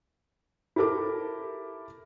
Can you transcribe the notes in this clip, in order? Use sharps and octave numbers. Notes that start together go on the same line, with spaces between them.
E4 G4 A4 A#4 D6